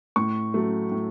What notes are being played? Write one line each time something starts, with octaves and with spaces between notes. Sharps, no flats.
A2 C#6
F#3 A3
A2